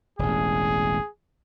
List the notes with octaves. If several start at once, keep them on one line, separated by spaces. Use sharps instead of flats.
E1 A1 G#4